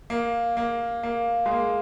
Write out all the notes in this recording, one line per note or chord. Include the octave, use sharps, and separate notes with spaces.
A#3
A#3
A#3
G#3
A#3